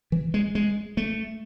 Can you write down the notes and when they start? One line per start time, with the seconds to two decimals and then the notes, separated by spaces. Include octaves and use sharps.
0.12 E3
0.34 G#3
0.55 G#3
0.97 A3